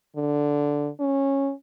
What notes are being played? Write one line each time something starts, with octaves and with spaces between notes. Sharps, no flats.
D3
C#4